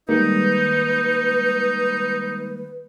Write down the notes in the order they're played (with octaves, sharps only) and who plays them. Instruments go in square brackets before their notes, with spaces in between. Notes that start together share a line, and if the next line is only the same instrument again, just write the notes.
[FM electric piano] D#3 G3 G#3 [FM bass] A#3 [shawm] D#4 [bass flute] B4